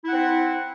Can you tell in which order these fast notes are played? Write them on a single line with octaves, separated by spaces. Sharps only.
E4 F#5 C4